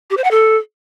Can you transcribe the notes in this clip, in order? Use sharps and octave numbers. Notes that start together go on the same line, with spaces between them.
G4
C5
F#5
A4